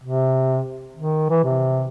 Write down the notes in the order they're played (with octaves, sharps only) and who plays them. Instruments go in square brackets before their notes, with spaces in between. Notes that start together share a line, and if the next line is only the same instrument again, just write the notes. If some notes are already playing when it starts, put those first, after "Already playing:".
[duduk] C3
D#3
E3
C3